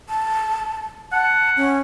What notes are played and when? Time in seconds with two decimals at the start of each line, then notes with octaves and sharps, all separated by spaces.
0.09 A5
1.12 F#5 A5
1.57 C#4